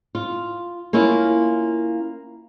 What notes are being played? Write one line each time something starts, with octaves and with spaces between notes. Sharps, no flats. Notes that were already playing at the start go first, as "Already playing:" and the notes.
F4
A#3 C#4 E4 F4